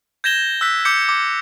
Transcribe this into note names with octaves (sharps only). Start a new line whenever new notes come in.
G6 G#6 A#6 E7 G7
E6 F#6 B6
D6 G6 C#7
D6